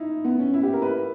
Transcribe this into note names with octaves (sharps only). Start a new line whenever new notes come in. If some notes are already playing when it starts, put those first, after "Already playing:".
Already playing: D#4 E4
B3
C#4
E4
G4
A#4
B4